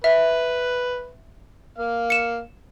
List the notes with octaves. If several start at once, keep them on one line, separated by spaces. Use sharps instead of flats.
B4 E5
A#3 F5
C#7 E7